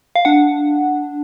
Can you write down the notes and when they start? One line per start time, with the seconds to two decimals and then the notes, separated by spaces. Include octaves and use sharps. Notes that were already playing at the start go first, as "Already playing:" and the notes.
0.15 F5
0.25 D4 F#5